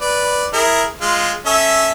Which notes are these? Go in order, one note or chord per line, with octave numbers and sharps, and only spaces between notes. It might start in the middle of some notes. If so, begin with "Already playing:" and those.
B4 D5
E4 G#4 A#4
G#3 F4
C#4 A4 E5